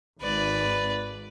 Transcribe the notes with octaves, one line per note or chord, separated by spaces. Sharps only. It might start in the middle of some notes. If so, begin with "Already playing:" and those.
G#1 B4 D5